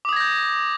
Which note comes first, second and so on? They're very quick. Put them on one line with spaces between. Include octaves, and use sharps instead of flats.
D6 D#6 G#6 A#6 G6